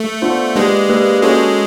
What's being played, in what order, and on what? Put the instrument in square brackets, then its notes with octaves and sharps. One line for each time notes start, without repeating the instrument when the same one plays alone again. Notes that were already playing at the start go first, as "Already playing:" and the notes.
Already playing: [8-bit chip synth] A3
[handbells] B3 D4 F4 A4 C5
[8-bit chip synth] G#3 [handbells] A#3 D4 G4 B4
[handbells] A#3 D4 G4 B4
[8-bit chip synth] G#3 [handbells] C#4 F#4 A4 C#5